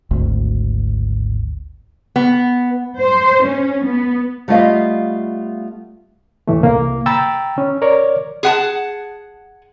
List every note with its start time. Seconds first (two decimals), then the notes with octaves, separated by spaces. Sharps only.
0.11 G#1 D2
2.16 B3
3.00 C5
3.45 C#4
3.85 B3
4.48 G3 A3 B3 F4 D#5 F5
6.48 D#2 A2 E3 A3
6.62 C2 C3 A#3
7.06 G5 A#5 B5 E6 A6
7.58 C#4
7.82 A#4 C#5 D5
8.43 G#4 F#5 A5